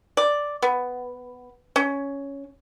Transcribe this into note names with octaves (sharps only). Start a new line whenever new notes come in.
D5
B3
C#4